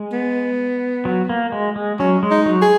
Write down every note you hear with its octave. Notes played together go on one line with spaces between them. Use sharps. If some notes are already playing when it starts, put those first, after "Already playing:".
Already playing: G#3
B3
F#3
A#3
G#3
G#3
F#3 C#4
G#3
D#4
F#3
G#4